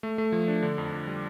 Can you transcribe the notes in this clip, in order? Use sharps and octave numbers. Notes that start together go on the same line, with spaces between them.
A3
A3
F3
D4
D3
F2
F2
G3